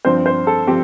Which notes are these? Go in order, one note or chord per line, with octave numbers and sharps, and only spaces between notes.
G2 F3 C4 C5
C5
A4
F3 C4 G4